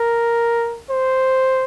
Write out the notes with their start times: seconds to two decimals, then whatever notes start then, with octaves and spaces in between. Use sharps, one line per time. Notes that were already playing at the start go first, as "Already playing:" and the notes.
Already playing: A#4
0.90 C5